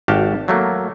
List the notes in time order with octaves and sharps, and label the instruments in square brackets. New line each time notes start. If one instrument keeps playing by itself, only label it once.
[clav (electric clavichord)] G#1 F#4 G4 F5 A5
F#3 A3 A#3